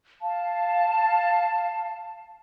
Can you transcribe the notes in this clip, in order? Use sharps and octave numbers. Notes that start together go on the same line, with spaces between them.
F5 A5